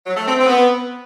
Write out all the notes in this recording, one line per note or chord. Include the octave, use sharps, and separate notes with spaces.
F#3
A3
C4
C4
B3